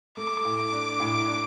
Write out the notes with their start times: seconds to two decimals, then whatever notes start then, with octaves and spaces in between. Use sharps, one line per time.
0.17 A3 D6
0.45 A2
0.73 D4
1.00 A2
1.28 D4